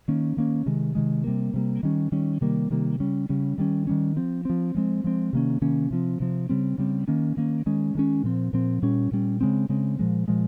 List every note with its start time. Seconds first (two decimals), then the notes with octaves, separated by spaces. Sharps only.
0.08 D#3 A#3 C#4
0.37 D#3 A#3 C#4
0.66 C3 D#3 G#3
0.95 C3 D#3 G#3
1.24 C3 G3 A#3
1.54 C3 G3 A#3
1.83 D#3 G3 C#4
2.12 D#3 G3 C#4
2.41 C3 D#3 G3 A#3
2.70 C3 D#3 G3 A#3
3.00 C#3 G3 C#4
3.29 C#3 G3 C#4
3.58 D#3 G3 C#4
3.87 D#3 G3 C#4
4.16 F3 C4
4.45 F3 C4
4.75 F3 G#3 C4
5.04 F3 G#3 C4
5.33 C3 D#3 A#3 C#4
5.62 C3 D#3 A#3 C#4
5.91 C3 F3 C4
6.20 C3 F3 C4
6.49 C#3 G3 C4
6.78 C#3 G3 C4
7.08 D#3 A#3 C#4
7.37 D#3 A#3 C#4
7.66 D#3 G#3 C#4
7.95 D#3 G#3 C#4
8.24 A#2 F3 C4
8.53 A#2 F3 C4
8.82 A#2 G3 C#4
9.11 A#2 G3 C#4
9.41 C#3 G#3 C4
9.69 C#3 G#3 C4
9.99 A#2 F3 G#3
10.28 A#2 F3 G#3